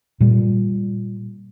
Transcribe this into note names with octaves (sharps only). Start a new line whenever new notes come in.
A#2 G3